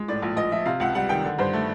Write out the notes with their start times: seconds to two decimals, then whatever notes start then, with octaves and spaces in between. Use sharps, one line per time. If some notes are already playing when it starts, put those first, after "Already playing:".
Already playing: G#3
0.08 A2 D5
0.22 A#1
0.36 A#1 D#5
0.52 F3 E5
0.66 C3 F5
0.80 C#2 F#5
0.95 G3 F#5
1.09 D#3 G5
1.24 D3
1.39 G2 C5
1.53 A3